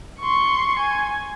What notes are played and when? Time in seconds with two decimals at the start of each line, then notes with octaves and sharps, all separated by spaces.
0.20 C6 C#6
0.79 G#5